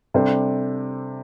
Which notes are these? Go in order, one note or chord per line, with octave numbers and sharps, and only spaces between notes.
C3 G3 D4 A4 C5